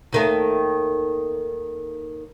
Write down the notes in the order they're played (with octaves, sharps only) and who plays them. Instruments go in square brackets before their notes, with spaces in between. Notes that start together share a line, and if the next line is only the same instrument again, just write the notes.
[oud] D#2 D#3 A3